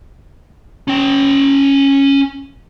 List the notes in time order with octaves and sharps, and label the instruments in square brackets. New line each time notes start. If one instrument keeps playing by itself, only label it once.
[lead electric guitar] C#4 G5